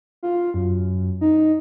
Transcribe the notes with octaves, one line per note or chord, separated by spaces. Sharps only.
F4
F#2
D#4